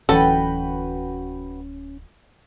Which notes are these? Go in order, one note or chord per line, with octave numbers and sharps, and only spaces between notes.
D1 E3 C#4 F#4 A4 B4 G5